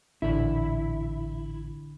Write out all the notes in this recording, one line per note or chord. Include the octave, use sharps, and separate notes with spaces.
A1 A#2 D3 E4 B5